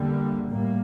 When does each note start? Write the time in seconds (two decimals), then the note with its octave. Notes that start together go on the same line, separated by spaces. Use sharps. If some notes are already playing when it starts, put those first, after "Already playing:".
Already playing: E2 D3 G3 A#3
0.46 A2 G3 A#3